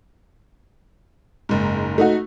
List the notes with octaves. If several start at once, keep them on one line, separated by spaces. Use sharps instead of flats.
F#1 G#2
A3 D#4 F#4